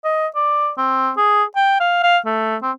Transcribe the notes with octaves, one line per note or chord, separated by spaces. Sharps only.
D#5
D5
C4
G#4
G5
F5
F5
A3
C4